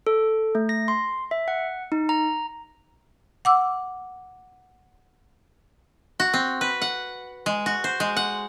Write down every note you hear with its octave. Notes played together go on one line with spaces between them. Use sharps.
A4
A3
A#6
C6
E5
F#5
D#4
A#5
F#5 D6 E6
F#4
C4
B4
F#5
G#3
F#4
C5
G#3
F#5